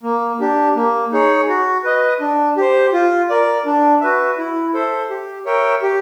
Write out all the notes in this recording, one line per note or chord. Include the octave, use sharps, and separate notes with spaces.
A#3
D4 G4
A#3
D#4 G#4 C#5
F#4
B4 D#5
D4
G4 C5
F4
A#4 D5
D4
F#4 B4 E5
E4
A4 C5 E5
G4
A#4 C#5 E5 G5
G4